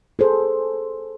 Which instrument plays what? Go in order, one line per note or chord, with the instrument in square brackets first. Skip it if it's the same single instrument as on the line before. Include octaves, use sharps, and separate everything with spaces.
[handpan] G#4 A4 C5